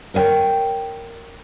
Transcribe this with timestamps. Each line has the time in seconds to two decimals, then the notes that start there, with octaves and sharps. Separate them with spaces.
0.14 A#4 C#5 E5 G5